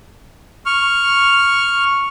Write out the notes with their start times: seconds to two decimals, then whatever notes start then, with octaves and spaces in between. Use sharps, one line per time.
0.66 C#6 F6